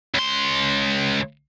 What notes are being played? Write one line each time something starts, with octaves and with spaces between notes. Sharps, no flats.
C#2 C6